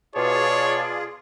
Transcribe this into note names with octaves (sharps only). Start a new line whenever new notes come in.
B2 F4 G#4 C#5 D5 A5